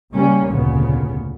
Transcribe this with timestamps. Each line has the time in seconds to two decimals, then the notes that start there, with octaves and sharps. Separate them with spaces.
0.12 C#3 G3 A#3 C#4
0.48 F1 D2 A#2 C#3 B3